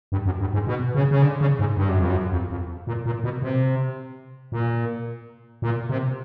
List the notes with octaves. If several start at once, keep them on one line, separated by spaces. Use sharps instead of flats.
G2
F#2
G2
G#2
B2
C#3
C#3
D3
C#3
G#2
G2
F#2
F2
F#2
F2
F2
A#2
A#2
B2
C3
A#2
A#2
C3